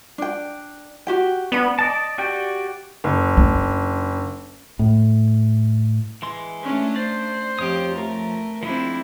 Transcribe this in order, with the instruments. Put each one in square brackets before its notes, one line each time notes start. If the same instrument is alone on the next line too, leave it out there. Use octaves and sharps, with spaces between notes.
[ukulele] D4 G5
F#4 G4 G5
[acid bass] B3 [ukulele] D4 B5
[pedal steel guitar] D5 D#5 A5
F#4 G4 D5 G5
[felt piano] F#1
[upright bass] D4
[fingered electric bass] A2
[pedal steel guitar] E3 G#3 C6
[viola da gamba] A3 D4 [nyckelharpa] C#4
[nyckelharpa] C5 [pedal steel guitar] D5
[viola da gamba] F2 G4 [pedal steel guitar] F3 C#5 D#6
[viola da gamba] A3 [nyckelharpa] A#4
[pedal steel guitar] F3 G#3 D4 [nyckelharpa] C4 E4